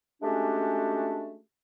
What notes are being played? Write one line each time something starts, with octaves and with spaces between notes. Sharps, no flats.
G#3 A3 C#4 D4 F#4 G4